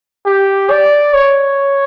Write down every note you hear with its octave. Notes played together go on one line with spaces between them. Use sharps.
G4
D5
C#5